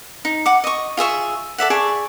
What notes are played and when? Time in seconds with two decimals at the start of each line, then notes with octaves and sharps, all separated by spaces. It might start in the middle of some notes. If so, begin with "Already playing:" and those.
0.25 D#4
0.46 F#5 D6
0.64 D#5 C#6
0.97 F4 G#4 E5 C#6
1.58 A4 D5 E5 F#5
1.70 G#4 D5 A5 C#6